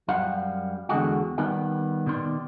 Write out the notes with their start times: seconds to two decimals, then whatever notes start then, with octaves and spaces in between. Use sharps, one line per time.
0.08 F#2 G3 F5 F#5
0.89 E2 D3 G#3 F#4
1.38 D#3 G3 B3
2.06 B2 D#3 D5 C6